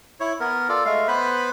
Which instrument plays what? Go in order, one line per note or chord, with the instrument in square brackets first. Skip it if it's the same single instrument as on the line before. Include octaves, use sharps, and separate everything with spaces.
[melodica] E4 C#5
B3 A#4
F4 A4 D5
G#3 A3 F5
B3 B4 C5 B5